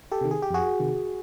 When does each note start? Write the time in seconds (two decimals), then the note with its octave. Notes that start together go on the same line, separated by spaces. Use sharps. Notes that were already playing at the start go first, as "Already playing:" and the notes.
0.11 G4 A4
0.21 C3 D#3
0.31 G#4
0.42 G4
0.50 F2 F#4 G#4
0.80 C3 D#3